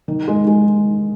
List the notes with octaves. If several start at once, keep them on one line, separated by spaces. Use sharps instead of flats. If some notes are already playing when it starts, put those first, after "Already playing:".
D#3
G#3
G#3